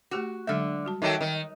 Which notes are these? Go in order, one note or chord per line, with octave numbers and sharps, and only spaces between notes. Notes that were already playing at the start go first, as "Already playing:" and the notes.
A3 F#4 G4 D6
D3 F#3 G#3 E5
G3 F#4 A5
D#3 F#3 D#4 A4 D#5 E5 G5 D6
D#3